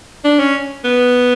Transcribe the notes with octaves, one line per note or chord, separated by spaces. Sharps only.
D4
C#4
B3